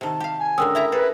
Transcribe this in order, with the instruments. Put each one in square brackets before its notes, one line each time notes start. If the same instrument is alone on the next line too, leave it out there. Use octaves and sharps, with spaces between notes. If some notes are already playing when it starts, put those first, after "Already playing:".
[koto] C3 D#3 [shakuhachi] A5
[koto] G4 F5
[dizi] G#5
[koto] D3 G#3 C#4 [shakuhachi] A#4 [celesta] G5 D#6 E6
[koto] A3 E4 A#5 [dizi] E5
[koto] G#4 A4 [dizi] B4